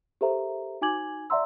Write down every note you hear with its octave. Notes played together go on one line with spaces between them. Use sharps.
G4 A4 A#4 C5 E5 A#5
D#4 F#4 G#5 D6 G#6 F#7
D5 E5 F#5 A#5 C6 E6